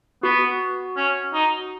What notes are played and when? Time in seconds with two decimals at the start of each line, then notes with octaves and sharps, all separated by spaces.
0.23 B3 F#4
0.96 C#4
1.34 D#4